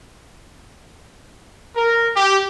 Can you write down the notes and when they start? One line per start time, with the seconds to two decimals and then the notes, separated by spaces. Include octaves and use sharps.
1.76 A#4
2.15 G4